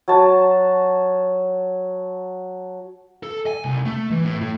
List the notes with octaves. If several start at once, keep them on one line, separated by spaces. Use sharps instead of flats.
F#3 A5
A4
G#5
C2
A3
E3
A2
A2